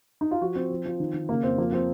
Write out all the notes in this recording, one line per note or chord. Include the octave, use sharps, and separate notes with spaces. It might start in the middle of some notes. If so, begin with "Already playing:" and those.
D#4
F4
F3 F#4
F3 C4
F3
F3
D#3
D#3
C#3 A#3
F2 C4
F3 A#3
F3 C4